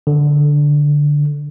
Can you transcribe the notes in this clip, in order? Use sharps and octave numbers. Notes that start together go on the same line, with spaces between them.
D3